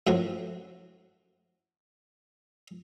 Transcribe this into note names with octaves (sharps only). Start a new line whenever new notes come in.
F#2 A2 F3 F#4